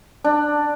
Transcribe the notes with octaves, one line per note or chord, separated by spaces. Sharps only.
D4